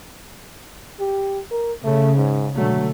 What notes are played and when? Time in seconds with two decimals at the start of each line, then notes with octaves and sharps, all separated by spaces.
0.99 G4
1.51 A#4
1.84 C#3 A3
2.16 G#2
2.58 B2 D3 F#3 A3